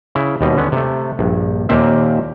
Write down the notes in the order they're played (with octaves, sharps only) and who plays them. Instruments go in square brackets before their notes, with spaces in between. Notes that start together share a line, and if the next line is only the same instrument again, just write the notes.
[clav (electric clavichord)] C#3 E4
D#2 B2 G3 D#5
D3 B3 C#4
C3 A3
A#1 G2
D#2 A#2 A#3 C4 E5